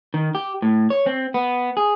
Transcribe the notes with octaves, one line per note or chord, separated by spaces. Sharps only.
D#3
G4
A2
C#5
C4
B3
G#4